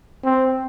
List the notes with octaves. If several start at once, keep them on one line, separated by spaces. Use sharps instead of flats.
C4